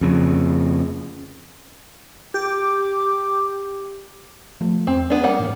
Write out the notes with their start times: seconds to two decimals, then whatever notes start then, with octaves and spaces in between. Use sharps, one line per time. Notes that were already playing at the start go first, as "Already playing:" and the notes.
0.01 F2 C#3
2.34 G4 D6
4.61 F3 A3
4.87 E2 C4
5.10 B3 C#4 D4
5.24 G3 A#3 F#5
5.40 G#2 E3